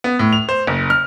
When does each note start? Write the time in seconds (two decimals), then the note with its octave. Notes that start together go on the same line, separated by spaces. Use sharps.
0.04 B3
0.19 A2
0.33 F7
0.49 C5
0.67 F#1
0.90 F6